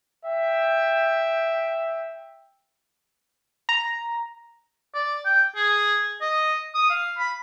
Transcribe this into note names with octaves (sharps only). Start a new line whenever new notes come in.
E5 G5
A#5
D5
G5
G#4
D#5
D#6
F5
B5